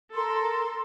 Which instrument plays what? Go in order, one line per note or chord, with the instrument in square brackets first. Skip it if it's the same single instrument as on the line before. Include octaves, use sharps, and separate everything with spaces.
[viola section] A4 [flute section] A#4 C6